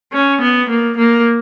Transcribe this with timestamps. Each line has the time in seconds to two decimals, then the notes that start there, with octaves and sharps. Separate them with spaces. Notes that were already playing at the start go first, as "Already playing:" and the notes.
0.13 C#4
0.41 B3
0.70 A#3
0.98 A#3